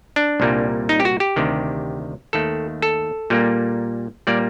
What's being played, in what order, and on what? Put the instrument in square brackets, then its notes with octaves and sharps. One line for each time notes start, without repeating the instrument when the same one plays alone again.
[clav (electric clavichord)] D4
C2 A#2 G3 A#3
D#4
G4
F#4
G4
D2 C3 D#3
D#2 D#3 A3 A4
A4
A#2 G3 A#3
A#2 G3 A#3 D5